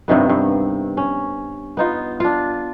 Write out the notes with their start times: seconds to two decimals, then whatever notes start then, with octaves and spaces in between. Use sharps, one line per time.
0.08 G2 C3 D#3 B3
0.30 G2
0.97 C#4
1.77 B3 D#4 F4
2.20 D4 F4